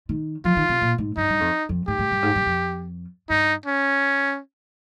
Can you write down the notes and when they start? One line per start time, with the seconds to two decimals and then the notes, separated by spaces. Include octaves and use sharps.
0.09 D#3
0.45 F3 F4
0.56 D#3
0.69 C3
0.81 A#2
0.98 G#2
1.17 G2 D#4
1.29 G2
1.40 F2
1.69 F2
1.87 G#2 G4
1.99 G#2
2.11 G2
2.22 G#2
2.35 G2
2.46 F2
3.29 G2 D#4
3.65 C#4